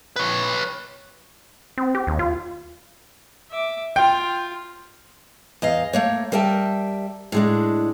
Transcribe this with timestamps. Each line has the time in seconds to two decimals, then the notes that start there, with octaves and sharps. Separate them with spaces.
0.16 B4 C#5
1.78 C4
1.95 G4
2.07 D#2
2.19 F4
3.51 E5 D6
3.96 F4 G5
5.62 E2 D#5 F5
5.93 A3 A#3 C#5
6.32 G3 A#4 E5 G5 A5
7.32 A2 G#3 D4